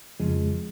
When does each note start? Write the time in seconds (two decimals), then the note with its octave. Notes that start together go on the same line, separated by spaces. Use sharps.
0.20 F2 C#3 F3 G#3